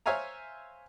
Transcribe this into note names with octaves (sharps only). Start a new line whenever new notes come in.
C5 C#5 E5 F5 G#5 A#5